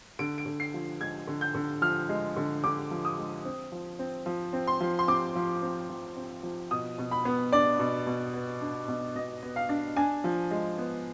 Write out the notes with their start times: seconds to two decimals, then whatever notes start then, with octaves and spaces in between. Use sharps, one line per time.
0.19 D3 D7
0.38 D7
0.46 D3
0.60 C7
0.74 F3
1.00 G#3 G#6
1.28 D3
1.41 G6
1.55 D3
1.82 F3 F6
2.09 G#3
2.37 D3
2.64 D3 D6
2.91 F3
3.05 D#6
3.18 G#3
3.45 C4
3.72 F3
3.99 C4
4.26 F3
4.53 C4
4.67 C6
4.81 F3
4.99 C6
5.07 C4 D6
5.36 F3
5.62 C4
5.90 F3
6.17 C4
6.43 F3
6.71 B2 D#6
6.98 B2
7.11 B5
7.25 B3
7.52 D4 D5
7.79 B2
8.07 B2
8.34 B3
8.61 D4
8.88 B2
9.15 B2 D#5
9.43 B3
9.56 F5
9.69 D4
9.97 D4 G#5
10.24 F3
10.51 G#3
10.78 B3